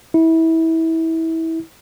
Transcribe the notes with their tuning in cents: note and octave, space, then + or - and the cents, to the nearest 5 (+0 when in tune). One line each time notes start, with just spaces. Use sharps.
E4 -25